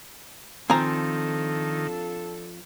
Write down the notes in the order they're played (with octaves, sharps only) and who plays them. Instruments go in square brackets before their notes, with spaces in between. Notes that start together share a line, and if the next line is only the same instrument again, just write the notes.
[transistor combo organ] D#3 [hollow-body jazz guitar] F3 C4 [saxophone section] D4 F4 A4 [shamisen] G#5 A#5